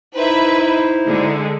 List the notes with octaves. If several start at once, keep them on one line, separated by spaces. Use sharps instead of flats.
D#4 E4 B4 C5 E5
D3 G#3